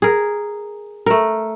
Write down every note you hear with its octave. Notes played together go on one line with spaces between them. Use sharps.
G#4 A#4
A3 A#4